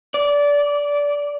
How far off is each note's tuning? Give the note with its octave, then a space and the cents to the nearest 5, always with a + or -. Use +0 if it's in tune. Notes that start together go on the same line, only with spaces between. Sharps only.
D5 -20